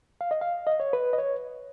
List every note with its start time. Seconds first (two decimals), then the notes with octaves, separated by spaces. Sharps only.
0.21 F5
0.31 D#5
0.41 F5
0.67 D#5
0.80 C#5
0.93 B4
1.13 D#5
1.18 C#5